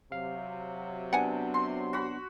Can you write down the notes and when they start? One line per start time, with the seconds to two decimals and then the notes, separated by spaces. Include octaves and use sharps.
0.12 C3 F#3 F5
1.13 B3 D4 F#5 G#5
1.54 C6
1.93 F#4 B5